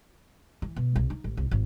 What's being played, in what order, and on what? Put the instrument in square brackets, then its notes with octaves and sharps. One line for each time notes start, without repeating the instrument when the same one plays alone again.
[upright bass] E3
B2
C2
D#4
A1
C2
G#1